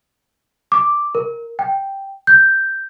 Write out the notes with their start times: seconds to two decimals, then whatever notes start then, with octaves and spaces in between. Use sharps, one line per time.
0.72 D6
1.15 A#4
1.59 G5
2.27 G6